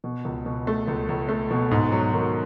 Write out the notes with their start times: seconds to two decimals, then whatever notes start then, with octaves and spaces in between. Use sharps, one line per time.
0.04 B2
0.25 C#2
0.46 B2
0.67 A3
0.88 C#2
1.09 C#2
1.29 A3
1.51 B2
1.71 G#2
1.92 F#3
2.13 D#3